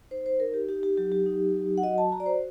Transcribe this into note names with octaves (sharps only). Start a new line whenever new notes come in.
D#4 C5
C5
D#4 A#4
G4
D#4 G4
G4
F#3 G4
G4
D#4
F#3
F#5
F#4 D#5
A5
F#4 A#5
D5
C5